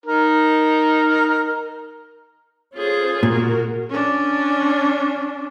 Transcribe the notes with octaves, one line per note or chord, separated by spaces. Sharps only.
D#4 A#4
C#4 F4 G#4 A4 C5
A#2 F#4 A#4
C#4 D4